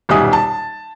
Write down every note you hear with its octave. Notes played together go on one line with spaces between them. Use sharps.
D#1 B1 G3 E5 G#5 D#6
A5